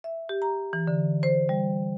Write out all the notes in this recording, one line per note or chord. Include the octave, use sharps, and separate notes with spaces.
E5
G4
A#5
E3
D3
C5
G3